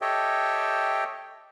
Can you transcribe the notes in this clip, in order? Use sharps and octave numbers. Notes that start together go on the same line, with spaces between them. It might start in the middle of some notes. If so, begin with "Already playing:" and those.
G4 A4 C#5 D#5 E5 G5